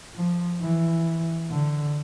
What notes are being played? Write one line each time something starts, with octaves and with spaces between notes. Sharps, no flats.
F3
E3
D3